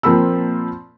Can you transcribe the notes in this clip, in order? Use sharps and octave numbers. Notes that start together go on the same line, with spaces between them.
A#2 F3 C4 A#4 B5 E6